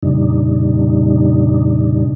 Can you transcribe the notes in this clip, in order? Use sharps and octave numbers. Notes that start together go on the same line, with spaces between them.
F2 A#2 C#3 G3 D4 D#4